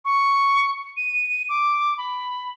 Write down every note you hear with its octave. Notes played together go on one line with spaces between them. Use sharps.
C#6
D#7
D#7
D6
B5